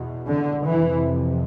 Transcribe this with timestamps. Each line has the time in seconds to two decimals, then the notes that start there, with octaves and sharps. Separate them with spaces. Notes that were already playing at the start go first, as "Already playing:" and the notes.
Already playing: E2 B2
0.28 D3
0.66 F2 C3 E3